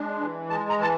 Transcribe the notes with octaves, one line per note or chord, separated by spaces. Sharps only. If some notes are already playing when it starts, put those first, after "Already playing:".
Already playing: G#3 D4
E3
G#3 A5
A#5
E3 A5